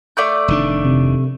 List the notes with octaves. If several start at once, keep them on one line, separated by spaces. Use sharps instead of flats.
A3 D5 G6
F1 D#3 D4
C3